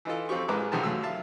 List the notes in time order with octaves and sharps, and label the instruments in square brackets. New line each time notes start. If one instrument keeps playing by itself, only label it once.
[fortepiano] E3 D#4 F4 A4
F2 C4 F4 G4 C#6
A1 G#3 A#4 B4 D6
B1 F2 C3 D#3 A5
F#2 A3 F5 E6
E5 F5 A5